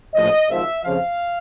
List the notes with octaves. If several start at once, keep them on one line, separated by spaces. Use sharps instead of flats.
A#1 A2 F3 D#5
G#1 G#2 F3 E5
F2 C#3 F3 F5